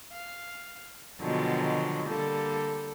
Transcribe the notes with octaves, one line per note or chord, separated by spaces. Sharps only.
F5
B2 D3 D#3 F3 F#3 G#3
D3 G3 A#3 A4